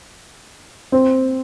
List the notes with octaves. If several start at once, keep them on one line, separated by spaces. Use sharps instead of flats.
C4